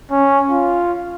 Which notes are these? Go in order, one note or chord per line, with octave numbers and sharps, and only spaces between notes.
C#4
F4